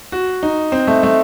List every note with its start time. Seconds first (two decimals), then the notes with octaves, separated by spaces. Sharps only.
0.12 F#4
0.43 D#4
0.72 C4
0.87 A3
1.03 A3